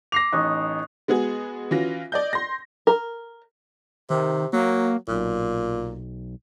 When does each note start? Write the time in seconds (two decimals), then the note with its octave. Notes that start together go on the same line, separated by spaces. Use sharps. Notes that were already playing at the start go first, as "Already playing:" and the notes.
0.12 D6 A#6 C7 F7
0.33 A1 D#4 C#6 D#6 F#6
1.08 G#3 B3 F#4 G#4
1.71 E3 C#4 F4 F#4 A#6
2.12 D5 D#5 G6
2.33 C6 A#6
2.87 A#4
4.10 C3 D#3
4.53 F#3 A#3
5.08 B1 A#2